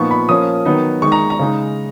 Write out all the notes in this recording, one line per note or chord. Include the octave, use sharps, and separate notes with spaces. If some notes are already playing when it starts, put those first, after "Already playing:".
Already playing: A#2 F3 B3 D#4 C#6
B5
F3 A#3 C#4 D#6
D#3 F#3 B3 D#4
D#3 G#3 D#4 C#6
A#5
A#5
C#3 G#3 D#4